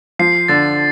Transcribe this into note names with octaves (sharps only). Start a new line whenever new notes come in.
F3 C7
D3 A6